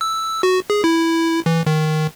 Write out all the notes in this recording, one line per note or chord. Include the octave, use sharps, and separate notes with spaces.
E6
F#4
G#4
E4
E3
D#3